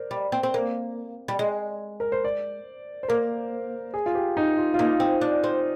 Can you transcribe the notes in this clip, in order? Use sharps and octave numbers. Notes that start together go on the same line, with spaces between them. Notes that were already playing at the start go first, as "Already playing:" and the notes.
Already playing: A#4 C5 D5
G3
C4
C4
A#3
G3
G#3
A#4
C5
D5
C5
A#3 A#4
G#4
F4
G4
D#4
F4
F4
A#3 D#4
C4
D4
C4